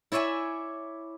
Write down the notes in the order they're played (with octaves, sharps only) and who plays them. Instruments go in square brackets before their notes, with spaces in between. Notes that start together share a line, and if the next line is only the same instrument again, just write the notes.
[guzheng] E4 C#5 D5 E5 G#5